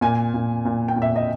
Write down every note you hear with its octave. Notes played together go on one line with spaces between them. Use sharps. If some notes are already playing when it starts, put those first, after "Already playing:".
A#2 G#5
A#2
A#2
G5
A#2
E5
D#5